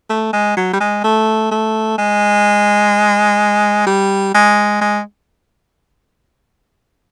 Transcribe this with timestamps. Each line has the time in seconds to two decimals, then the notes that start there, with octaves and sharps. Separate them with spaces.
0.10 A3
0.33 G#3
0.57 F#3
0.73 G3
0.80 G#3
1.04 A3
1.51 A3
1.98 G#3
3.86 G3
4.34 G#3
4.81 G#3